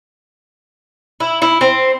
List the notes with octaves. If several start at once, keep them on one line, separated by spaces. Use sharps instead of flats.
E4
E4
C4